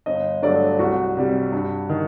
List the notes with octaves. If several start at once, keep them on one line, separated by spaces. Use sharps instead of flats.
G1 D#5
G2 F#3 A3 D5
C2 F#4
C3 G3
G2
D#3